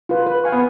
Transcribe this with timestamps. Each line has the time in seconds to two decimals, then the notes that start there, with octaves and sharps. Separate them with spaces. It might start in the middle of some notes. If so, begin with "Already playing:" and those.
0.09 F4 B4
0.26 B4
0.44 F5 G#5 C#6
0.52 B3